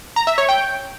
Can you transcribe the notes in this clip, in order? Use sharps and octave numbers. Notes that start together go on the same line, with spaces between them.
A#5
E5
C#5
G5